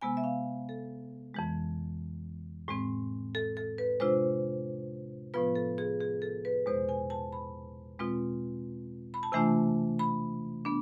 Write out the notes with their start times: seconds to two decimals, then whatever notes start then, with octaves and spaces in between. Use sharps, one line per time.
0.01 C3 G#3 B3 G#5
0.17 E5
0.24 F5
0.69 A4
1.35 F2 E3 G#3
2.68 A2 G#3 C4
3.35 A4
3.57 A4
3.78 B4
4.00 C3 G#3 D4 F4 C5
5.34 A2 F3 B3 F4 B4
5.55 A4
5.78 G#4
6.01 G#4
6.22 A4
6.45 B4
6.66 E2 B2 G#3 C5
6.89 G#5
7.10 A5
7.32 B5
7.99 B2 G#3 C4 F4
9.14 B5
9.23 A5
9.32 C3 E3 A3 D4 F4 G#5
9.99 B5
10.65 B3 D4